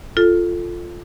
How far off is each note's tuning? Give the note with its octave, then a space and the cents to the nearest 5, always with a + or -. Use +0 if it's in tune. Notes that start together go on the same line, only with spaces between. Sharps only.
F4 +0 A4 +0